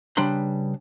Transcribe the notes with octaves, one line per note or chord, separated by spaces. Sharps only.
C#3 G3 D4 B4 A#5 C6